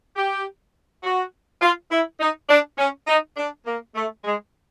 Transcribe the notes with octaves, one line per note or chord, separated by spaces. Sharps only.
G4
F#4
F4
E4
D#4
D4
C#4
D#4
D4
A#3
A3
G#3